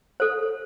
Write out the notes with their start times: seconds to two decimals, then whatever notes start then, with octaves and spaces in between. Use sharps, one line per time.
0.20 A4 C5